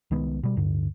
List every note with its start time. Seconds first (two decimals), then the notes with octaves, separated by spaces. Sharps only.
0.11 C2 D#3 G#3 B3
0.43 B2 G3
0.57 D1 G2 D3